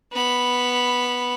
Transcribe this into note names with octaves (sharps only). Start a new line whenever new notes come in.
B3 B5